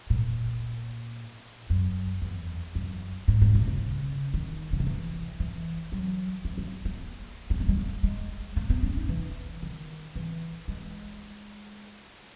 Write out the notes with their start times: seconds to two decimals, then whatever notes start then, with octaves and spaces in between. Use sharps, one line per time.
0.10 A#2
1.70 F#2
2.22 E2
2.75 F#2
3.28 G#2
3.42 G#2
3.55 A#2
3.67 C#3
4.34 D#3
4.73 C#3
4.80 D#3
4.86 E3
5.40 E3
5.92 F#3
6.45 E3
6.58 F#3
6.85 A#3
7.50 B3
7.60 A#3
7.69 G#3
7.77 A#3
8.03 G#3
8.57 A#3
8.70 B3
8.83 C#4
8.97 D#4
9.09 E3
9.62 D#3
10.15 E3
10.68 G#3